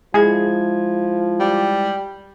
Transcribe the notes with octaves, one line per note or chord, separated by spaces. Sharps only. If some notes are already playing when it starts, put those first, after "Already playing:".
F3 G#3 E4 G#4 G#6
G3